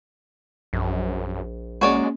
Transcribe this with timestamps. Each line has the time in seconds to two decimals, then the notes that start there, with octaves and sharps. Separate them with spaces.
0.73 A#1 F#2
1.81 G#3 A#3 C#4 F#4 C#5 D5